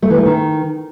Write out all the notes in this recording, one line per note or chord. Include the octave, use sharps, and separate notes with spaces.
A3
E3
A3
D#3